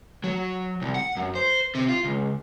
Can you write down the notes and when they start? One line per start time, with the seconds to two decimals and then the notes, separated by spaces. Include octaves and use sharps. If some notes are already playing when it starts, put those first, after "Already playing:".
0.24 F#3
0.82 C2
0.95 F#5
1.17 F#2
1.35 C5
1.75 C3
1.89 F4
2.05 C#2